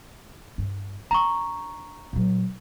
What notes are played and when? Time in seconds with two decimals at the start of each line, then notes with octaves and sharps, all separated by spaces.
0.58 G2
1.11 D4 A#5 C#6
2.13 A#2 F#3